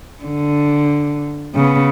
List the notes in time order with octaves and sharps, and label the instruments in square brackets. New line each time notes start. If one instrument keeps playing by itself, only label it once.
[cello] D3
C#3 B3